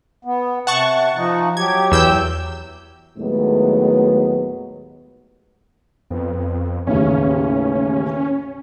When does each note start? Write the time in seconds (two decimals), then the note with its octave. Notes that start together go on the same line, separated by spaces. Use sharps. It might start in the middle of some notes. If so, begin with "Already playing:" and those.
0.25 B3
0.67 C3 F#5 A5 C#6
1.16 F3 D#4
1.57 F#3 G4 G#6
1.92 E2 E6 G6
3.18 D#2 A2 F#3 G#3 A3 B3
6.10 F2 B3
6.87 A1 D#2 C#3 C#4